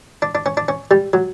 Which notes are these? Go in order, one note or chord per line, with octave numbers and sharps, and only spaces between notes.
D4
D4
C#4
D4
C#4
G3
F#3